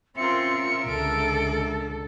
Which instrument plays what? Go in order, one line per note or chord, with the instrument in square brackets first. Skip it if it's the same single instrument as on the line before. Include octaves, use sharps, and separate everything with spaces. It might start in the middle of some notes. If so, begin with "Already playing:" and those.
[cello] C4 F4 [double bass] C#4 [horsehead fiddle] A#4 E5 [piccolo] C#7
[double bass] C#2 D3 [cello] A4 [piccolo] D7